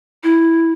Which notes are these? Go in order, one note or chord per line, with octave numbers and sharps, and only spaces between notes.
E4